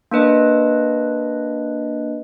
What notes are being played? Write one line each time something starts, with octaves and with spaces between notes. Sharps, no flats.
A#3 D4 B4 D#5